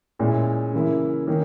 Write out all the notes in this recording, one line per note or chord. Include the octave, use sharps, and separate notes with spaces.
A#2 G#3 C#4 E4
C#3 E3 A#3 E4
D#3 A#3 C#4